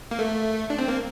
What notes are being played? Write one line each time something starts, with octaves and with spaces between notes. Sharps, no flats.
A#3
A3
D4
C4
A#3